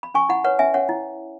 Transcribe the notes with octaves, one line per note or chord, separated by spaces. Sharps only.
B5
C#4 G#5 C#6
E4 F#5 B5
B4 C#5 F#5
C#4 E5 G#5
C#4 C#5 F#5
E4